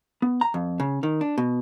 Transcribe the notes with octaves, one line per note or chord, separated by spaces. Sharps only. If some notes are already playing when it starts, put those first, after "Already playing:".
B3
A#5
F2
C#3
D#3
D4
B2